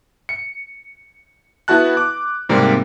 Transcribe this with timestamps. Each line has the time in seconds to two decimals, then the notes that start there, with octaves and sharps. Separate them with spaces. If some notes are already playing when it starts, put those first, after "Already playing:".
0.29 C#7
1.68 B3 E4 F#4 A5 F#6
1.97 D6
2.49 G#2 C3 G3 A#3 C4